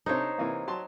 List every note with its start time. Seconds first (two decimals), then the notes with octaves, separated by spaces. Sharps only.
0.06 C3 D4 D#4 A4 C5 C#5
0.38 C3 E3 A#3
0.67 F#3 A5 C6